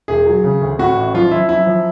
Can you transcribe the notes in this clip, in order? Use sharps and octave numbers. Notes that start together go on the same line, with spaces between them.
E1 G#4
F#3
C#3
D2
A2 F#4
A1
F3 F4
F3 E4
F#2 E4
F3